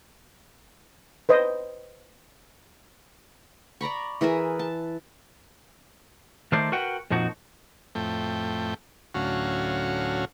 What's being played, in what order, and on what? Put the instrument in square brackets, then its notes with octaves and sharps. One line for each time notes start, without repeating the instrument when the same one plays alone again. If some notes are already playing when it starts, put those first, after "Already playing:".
[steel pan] B4 C5 D#5
[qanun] D5 A#5 B5 C#6
E3 G#4 A#4 E5
A5
[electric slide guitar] D#3 A3 A#4 C5 D5
F#4 A#4 B4 F#5 G5
F2 A#2 F3 D#4 F#4
[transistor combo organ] F2 A2 A3 G5
D2 A2 F#3 C#4 F#4 F5